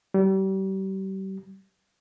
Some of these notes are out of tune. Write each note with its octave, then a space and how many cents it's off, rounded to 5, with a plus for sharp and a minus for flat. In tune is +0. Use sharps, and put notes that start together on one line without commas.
G3 -35